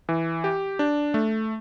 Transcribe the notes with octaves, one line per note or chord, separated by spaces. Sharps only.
E3
G4
D4
A3